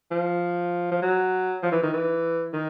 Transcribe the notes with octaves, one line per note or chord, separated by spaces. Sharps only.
F3
F3
F#3
F3
E3
D#3
E3
D#3